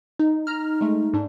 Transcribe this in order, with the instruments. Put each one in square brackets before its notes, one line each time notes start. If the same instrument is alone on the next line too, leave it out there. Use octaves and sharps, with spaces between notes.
[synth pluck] D#4
[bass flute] D#4 [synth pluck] A#5 F6
[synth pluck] G#3 A3
G#2 D4